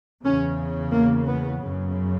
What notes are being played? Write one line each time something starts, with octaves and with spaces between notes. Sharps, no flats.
E2 C#3 C#4
A#3
B3
F#2 C#3